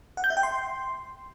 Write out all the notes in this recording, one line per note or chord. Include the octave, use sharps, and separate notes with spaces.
F#5
G6
E5
G5
C6